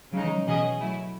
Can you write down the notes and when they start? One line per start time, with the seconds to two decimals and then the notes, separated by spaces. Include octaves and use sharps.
0.13 C#3 F#3 G#3 D#4
0.24 E3
0.34 F#3
0.46 B2 E3 F#3 C#4 G#4 D#5
0.80 F#3 A3 E4